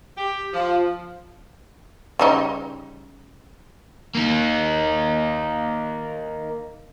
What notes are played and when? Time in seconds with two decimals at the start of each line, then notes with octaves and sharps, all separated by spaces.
0.18 G4
0.53 F3
2.19 C#3 G3 D#4
4.15 A#3 D#4